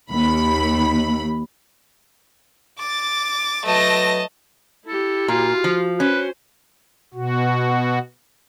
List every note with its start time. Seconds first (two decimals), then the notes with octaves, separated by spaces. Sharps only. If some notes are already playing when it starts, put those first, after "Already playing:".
0.11 D#2 B5
2.78 D6 A6
3.66 F#3 A3 B4 D#5 A5 A#6
4.86 E4 G4 A4
5.28 A#2 F4 F#4
5.64 F3
6.00 C#4 B4 C5
7.14 B2 F#4